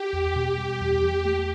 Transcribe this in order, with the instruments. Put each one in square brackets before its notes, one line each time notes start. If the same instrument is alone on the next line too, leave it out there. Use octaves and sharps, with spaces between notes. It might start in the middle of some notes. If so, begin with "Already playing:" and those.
Already playing: [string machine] G4
[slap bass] E2
B2
G3
E2
E2
A3